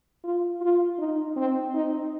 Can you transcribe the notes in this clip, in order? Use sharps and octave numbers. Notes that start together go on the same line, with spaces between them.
F4
F4
D#4
C4
D#4